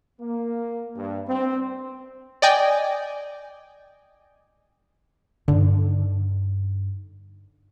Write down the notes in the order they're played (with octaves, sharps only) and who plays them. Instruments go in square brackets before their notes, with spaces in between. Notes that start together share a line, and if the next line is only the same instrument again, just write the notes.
[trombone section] A#3
G2
C4
[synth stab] D5 D#5 G5 G#5
[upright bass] G2 D#4 [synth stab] D3